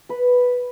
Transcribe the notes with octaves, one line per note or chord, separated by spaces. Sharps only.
B4